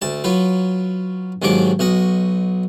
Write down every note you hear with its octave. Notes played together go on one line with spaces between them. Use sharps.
D2 A5
F#3 F4 B4
D#2 G#2 F#3 D4 D6
B1 F#4 D#5